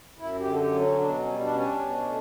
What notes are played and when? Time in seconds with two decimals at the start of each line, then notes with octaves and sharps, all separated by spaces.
0.19 F#2 E4
0.39 G4
0.45 D3
0.53 A4
0.59 G4
0.72 F#3
0.79 C#4
0.98 B2 D4
1.18 C#4
1.26 G3
1.39 D4
1.51 C#4
1.59 D4
1.79 B2
2.05 A3